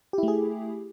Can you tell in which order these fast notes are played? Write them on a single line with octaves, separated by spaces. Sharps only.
G4 E4 A3 G#4